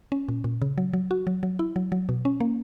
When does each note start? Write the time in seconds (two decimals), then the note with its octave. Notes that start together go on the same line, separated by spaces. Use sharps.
0.12 C#4
0.29 A#2
0.44 A#2
0.62 C#3
0.78 F#3
0.93 F#3
1.11 F#4
1.27 F#3
1.43 F#3
1.59 E4
1.76 F#3
1.92 F#3
2.09 B2
2.25 C#4
2.40 A#3